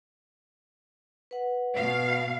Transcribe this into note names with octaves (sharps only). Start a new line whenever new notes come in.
B4 F#5
B2 F5